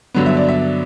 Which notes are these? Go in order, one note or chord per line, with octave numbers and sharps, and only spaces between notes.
G2 D3 F#3 B3
E5
D5
E5